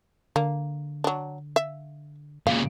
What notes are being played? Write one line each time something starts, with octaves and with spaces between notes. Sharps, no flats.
D3 A#3
F#3 D4
E5
A#2 C#3 F5